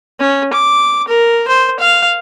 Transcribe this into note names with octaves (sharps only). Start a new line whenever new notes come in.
C#4
D6
A#4
C5
F5